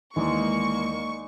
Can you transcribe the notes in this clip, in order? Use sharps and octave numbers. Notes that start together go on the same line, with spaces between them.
D#2 E3 G#3 A#3 D#4 D5 C#6